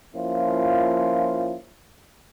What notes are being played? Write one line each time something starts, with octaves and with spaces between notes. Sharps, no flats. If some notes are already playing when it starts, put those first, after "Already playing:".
F3 A#3 C#4 E4 F4